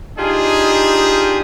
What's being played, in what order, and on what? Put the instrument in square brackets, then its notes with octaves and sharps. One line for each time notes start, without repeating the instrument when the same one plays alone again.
[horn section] D4 D#4 F4 G4 G#4